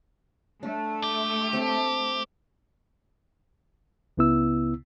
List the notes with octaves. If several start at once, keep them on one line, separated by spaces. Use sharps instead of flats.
A3 D4
G4
C4 A4 A5
C#2 C#3 B3 E4 E6